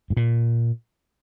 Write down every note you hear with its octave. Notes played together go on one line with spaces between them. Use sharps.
G#2
A#2